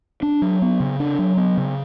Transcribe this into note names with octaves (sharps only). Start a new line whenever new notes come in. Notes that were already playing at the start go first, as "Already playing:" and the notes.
D4
F#3
B3
C#3
D4
F#3
B3
C#3